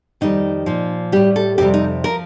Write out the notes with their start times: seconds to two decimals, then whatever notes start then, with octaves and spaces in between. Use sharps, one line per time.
0.21 F2 D#3 G3 D#4
0.66 A#2 F3
1.12 A2 G3 G4
1.36 A4
1.58 F2 C3 G3 G4
1.74 D#4
2.04 F3 A#4